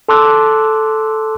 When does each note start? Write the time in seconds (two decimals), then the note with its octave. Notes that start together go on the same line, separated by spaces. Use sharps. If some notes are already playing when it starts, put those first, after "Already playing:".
0.09 A4 A5 C6 D6 E6 F#6